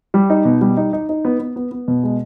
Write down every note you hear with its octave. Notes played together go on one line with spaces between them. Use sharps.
G3
D#4
B2
G3
D#4
D#4
D#4
B3
B3
B3
B3
B2
G#3